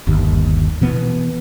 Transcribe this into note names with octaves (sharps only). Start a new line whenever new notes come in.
G1 D#2
B2 E3 B3